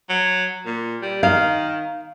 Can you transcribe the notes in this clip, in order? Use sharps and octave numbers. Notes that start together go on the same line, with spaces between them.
F#3
A#2
G3
D#3 F5